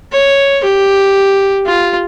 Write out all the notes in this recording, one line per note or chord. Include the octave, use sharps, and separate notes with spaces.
C#5
G4
F4